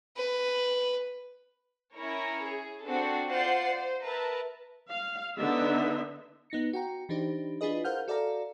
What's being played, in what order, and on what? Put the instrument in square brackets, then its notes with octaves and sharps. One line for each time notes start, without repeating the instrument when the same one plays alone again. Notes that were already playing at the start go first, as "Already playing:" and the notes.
[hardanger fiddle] B4
[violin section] C#4 E4 A#4 C#5
G#4
C4 D4 F#4 A4 C5
F4 C5 D5 F#5 C7
C5
A#4 B4 E5 A5 A#5
[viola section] F5
D3 B3 D#4 E5
[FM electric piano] B3 D#4 A#6 C#7
F#4 G5 A#5
E3 D4 D#4 G4 C5
D4 E4 F4 G#4 B4 D#5
A#4 C5 F5 F#5 F6 G6
F#4 A4 D5 E5 F5 A#5